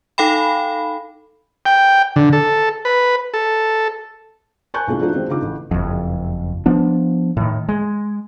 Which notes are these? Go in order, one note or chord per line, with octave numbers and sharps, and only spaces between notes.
D#4 A4 F5 G5 B5
G5
D3
A4
B4
A4
A#4 G#5 A5 C#6 F#6 G6
C2 G#3 A#3 D4 F4 A4
F3 A3 D4 D#4 F4 F#4
D#3 G#3 C4 D4
C#3 D4 D#4 F4 D6
A1 A3
F#1 F2
F3 B3 D4
A2 D#3
G#3